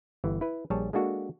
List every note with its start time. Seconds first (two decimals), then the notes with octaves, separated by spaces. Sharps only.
0.24 G1 E3
0.41 E4 B4
0.70 A#1 G3 G#4 C#5 A5
0.93 G#3 A#3 D4 F#4 A4